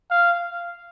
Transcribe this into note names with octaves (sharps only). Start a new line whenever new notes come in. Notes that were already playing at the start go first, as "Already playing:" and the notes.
F5